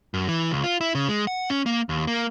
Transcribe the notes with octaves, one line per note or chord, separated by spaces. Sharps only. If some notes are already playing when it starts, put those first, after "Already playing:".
F#2
E3
C#2
F4
E4
C#3
G#3
F#5
C#4
A#3
D#2
A#3